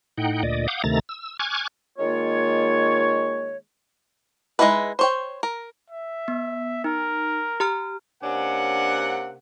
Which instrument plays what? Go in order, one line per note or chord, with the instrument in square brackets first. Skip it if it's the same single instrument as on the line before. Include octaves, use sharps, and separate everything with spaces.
[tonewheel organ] A2 D#4 F#5 G5
D2 A#2 D5 D#5
F5 F#5 D6 D#6 G6
D2 C3 D#3 A3 A#5 A6
E6
G#5 C#6 D6 F6 F#6 G#6
[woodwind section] D#3 G#3 A#3 F4 C#5
[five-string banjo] G#3 C#4 D#4 E4 B4
C5 C#5 G5
A#4
[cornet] E5
[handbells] B3
[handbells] D#4 [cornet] A#4
[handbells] G4 A#5 F6
[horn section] C3 A#3 C#4 D4 F#5